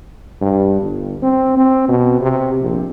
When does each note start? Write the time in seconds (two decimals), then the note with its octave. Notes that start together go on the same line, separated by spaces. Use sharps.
0.41 G2
0.81 G1
1.22 C4
1.57 C4
1.88 B2
2.21 C3
2.62 A#1